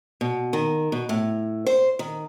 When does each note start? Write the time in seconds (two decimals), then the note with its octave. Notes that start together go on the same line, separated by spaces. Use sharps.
0.21 B2
0.53 D#3
0.92 B2
1.09 A2
1.66 C5
1.99 D#3